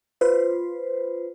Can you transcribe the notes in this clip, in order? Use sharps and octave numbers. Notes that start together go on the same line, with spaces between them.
F4 B4 C5